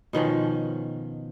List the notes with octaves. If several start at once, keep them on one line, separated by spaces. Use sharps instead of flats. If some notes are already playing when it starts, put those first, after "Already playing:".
B2 D#3 F3 C#4